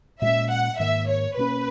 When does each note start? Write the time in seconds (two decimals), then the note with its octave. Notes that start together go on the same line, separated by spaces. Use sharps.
0.21 A#2 G#3 C#4 E5
0.50 F#5
0.79 G#2 D#3 A#3 E5
1.09 C#5
1.37 B2 A#3 C#4 B4